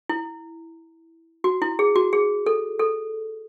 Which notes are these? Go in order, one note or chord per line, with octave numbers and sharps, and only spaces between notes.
E4
F#4
E4
G#4
F#4
G#4
A4
A4